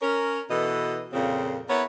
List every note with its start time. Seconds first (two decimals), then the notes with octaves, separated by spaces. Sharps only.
0.02 C#4 A#4
0.50 B2 E3 A4 D#5
1.13 F2 A#2 C#3 C4
1.69 B3 E4 A#4 C#5